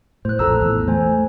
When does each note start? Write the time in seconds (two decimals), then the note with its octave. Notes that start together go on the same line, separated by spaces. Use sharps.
0.25 A2 C5 F#6
0.39 A#1 F2 F3 A4 A#5 E6
0.61 E2 A2
0.88 A3 C5 G#5